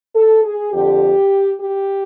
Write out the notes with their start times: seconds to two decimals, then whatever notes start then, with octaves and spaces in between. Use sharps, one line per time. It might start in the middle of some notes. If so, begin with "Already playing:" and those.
0.16 A4
0.44 G#4
0.73 F2 D3 G4
1.59 G4